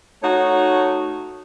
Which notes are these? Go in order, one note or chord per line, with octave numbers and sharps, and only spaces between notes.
A3 D#4 F#4 C#5